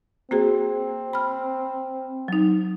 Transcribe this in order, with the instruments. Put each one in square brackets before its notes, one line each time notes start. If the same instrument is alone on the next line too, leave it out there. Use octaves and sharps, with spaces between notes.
[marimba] A#3 F#4 G#4 [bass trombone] C4
[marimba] B5 F6
F#3 D#4